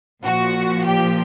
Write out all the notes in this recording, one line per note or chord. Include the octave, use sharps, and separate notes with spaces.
A#2 F3 F#4
G4